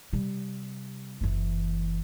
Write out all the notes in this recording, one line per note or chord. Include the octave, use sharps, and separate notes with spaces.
C3 G3
F#1 E3